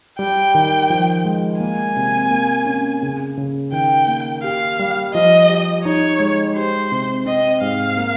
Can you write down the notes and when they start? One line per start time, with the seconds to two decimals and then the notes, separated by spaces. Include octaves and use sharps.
0.19 G3 G5
0.55 D#3
0.90 F3
1.25 G#3
1.60 A#3 G#5
1.97 C3
2.31 A#3
2.66 C#4
3.03 C#3
3.37 C#3
3.72 D#3 G5
4.08 A#3
4.43 G4 F5
4.79 G3
5.14 F3 D#5
5.50 G4
5.85 D#4 C#5
6.20 G#3
6.56 G4 C5
6.92 C3
7.26 C4 D#5
7.61 G#2 F5
7.97 A#3